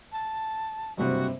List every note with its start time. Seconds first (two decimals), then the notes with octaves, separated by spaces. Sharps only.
0.12 A5
0.97 F#1 G2 C3 F#4